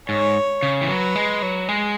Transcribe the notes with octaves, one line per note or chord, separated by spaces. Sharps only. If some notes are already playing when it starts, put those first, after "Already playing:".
G#2 C#5
C#3
E3
F#3 B4
G#3
F#3
G#3